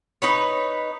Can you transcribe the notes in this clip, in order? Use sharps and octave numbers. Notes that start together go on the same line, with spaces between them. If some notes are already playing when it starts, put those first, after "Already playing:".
D#4 B4 C#5